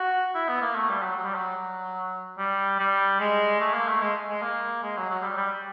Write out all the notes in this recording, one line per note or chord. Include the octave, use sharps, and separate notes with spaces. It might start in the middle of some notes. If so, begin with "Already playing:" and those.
Already playing: F#4
E4
B3
A#3
A3
G3
F#3
F#3
G3
F#3
G3
G3
G#3
A3
A#3
A3
G#3
G#3
A#3
G#3
F#3
F#3
G3
G3